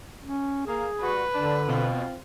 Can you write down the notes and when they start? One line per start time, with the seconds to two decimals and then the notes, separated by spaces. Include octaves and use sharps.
0.23 C#4
0.67 A#3 G#4
1.01 G3 F#4 B4
1.34 D3 D4
1.68 B2 C4 F4